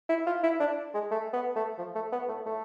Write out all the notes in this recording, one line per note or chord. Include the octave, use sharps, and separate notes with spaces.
E4
F4
E4
D4
G#3
A3
B3
A3
F3
A3
B3
A3
A3